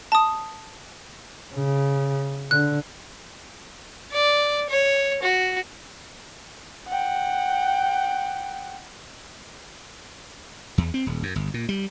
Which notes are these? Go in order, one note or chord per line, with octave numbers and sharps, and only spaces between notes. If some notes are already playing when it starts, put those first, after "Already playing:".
A5 D#6
C#3
D3 F#6
D5
C#5
F#4
F#5 G5
E2
C4
D#1
F#2
G1
A#2
G3